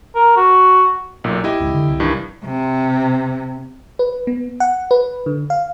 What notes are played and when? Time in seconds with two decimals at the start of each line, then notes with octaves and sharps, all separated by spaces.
0.15 A#4
0.36 F#4
1.24 B1 A#2
1.44 E4 G4 D#5
1.60 F1 C#2
1.74 D3
1.88 C2
2.00 G2 D#3 E3
2.44 C3
3.99 B4
4.27 B3
4.60 F#5
4.91 B4
5.26 D3
5.50 F5